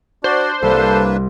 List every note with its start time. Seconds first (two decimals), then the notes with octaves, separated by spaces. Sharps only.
0.24 D4 F#4 C5 D5
0.62 C2 A#3 D4 A4 B4